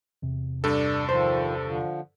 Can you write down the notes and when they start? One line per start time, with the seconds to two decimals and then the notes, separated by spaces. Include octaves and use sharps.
0.22 E2 C3
0.64 G2 D4 A4
1.09 D#3 F3 C5
1.65 D3 F3